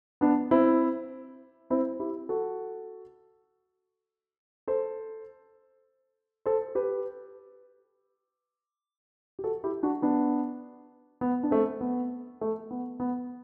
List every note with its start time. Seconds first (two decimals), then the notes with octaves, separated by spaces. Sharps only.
0.21 B3 D4
0.51 C4 E4
1.70 C4 E4
2.00 E4 G4
2.29 F#4 A4
4.68 A4 C5
6.46 A4 C5
6.75 G4 B4
9.39 G4
9.44 F#4 A4
9.64 E4 G4
9.83 D4 F#4
10.02 B3 D4
11.21 B3
11.43 D4
11.51 A3 C4
11.81 B3
12.41 A3
12.71 B3
13.00 B3